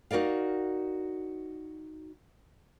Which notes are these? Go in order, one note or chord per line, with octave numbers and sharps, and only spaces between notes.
D#4 F#4 A#4 D5 F5